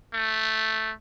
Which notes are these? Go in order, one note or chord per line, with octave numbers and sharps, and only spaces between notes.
A3